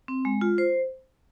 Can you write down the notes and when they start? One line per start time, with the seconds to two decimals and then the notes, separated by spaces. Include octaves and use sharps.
0.08 C4
0.25 G#3
0.41 F4
0.58 C5